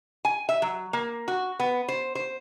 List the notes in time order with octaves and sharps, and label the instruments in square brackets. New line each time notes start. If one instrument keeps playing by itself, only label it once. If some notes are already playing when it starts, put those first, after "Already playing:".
[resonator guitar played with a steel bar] G#5
E5
F#3
A#3
F#4
B3
C5
C5